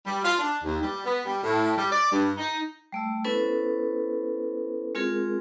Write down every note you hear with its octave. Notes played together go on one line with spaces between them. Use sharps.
G3
F4
D4
D#2
G3
B3
G3
A2
G3
D5
G2
D#4
G3 A3 E6
B3 C#4 E4 A4 B4 C5
G#3 C4 F4 G#4 A#4